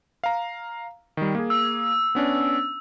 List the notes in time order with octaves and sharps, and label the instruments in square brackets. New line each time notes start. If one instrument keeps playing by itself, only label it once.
[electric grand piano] F5 A#5
D#3 G3
A#3 G#4
[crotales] E6
[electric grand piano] B3 C#4 D4